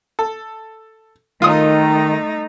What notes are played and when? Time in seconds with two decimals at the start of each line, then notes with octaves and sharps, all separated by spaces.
0.19 A4
1.42 D#3 A3 D#4 F4 D#6